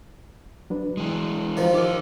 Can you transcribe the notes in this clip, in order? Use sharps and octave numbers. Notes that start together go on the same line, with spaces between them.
F#3 D4 B4
E3 F#3 G#3
D#3 F3
D#4 G4 A#4 D6